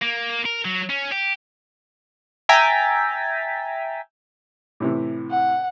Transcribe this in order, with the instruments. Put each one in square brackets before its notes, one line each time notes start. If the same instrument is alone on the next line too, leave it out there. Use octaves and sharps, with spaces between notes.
[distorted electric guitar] A#3
A#4
F#3
C#4
G4
[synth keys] E5 G5 G#5 A#5 A6 B6
[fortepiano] A2 C3 E3
[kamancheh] F#5